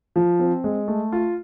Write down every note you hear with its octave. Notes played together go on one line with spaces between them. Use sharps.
F3
C4
G#3
A3
F4